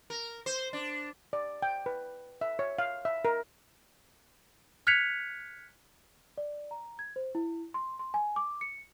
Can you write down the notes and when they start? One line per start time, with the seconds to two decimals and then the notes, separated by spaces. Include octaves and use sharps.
0.10 A#4
0.46 C5
0.73 D4
1.33 D5
1.62 G5
1.86 B4
2.41 E5
2.59 C#5
2.79 F5
3.05 E5
3.25 A#4
4.87 F6 F#6 G#6 B6 C#7 F7
6.38 D5
6.71 A#5
6.99 G#6
7.16 C5
7.35 E4
7.74 C6
7.99 C6
8.14 G#5
8.36 D6
8.61 C#7